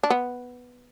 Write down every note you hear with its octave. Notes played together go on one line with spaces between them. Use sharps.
D4
B3